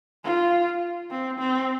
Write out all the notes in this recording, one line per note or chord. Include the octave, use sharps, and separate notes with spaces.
F4
C4
C4